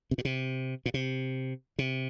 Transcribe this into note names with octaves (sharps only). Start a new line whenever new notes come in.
C3
A#2
C3
A#2
C3
C3